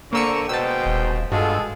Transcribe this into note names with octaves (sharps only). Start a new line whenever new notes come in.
D3 A#3 C5 A#5 C#6 E6 C#7
B2 G#3 C5 G5 A5 E6
D#1
G2 G#3 F4 F#4 A4